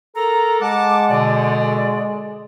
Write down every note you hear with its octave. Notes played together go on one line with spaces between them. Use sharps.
A4 A#4 A#5
G#3 F#5 A5 D6
B2 D3 D5